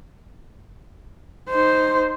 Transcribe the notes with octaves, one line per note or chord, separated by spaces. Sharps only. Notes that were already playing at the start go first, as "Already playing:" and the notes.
D#4 C5